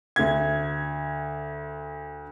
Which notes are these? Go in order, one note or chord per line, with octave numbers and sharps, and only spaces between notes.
D2 G#6